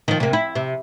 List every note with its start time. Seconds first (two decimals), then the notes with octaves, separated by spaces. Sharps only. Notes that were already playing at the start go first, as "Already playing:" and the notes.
0.08 D#3 F3
0.20 C3 A#3
0.33 E4
0.55 C3